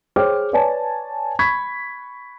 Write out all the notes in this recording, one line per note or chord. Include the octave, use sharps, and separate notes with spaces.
G#4 C5 C#5 G5 D6 F6
B4 C#5 D5 G#5 A5
B5 C#6 G#6 B6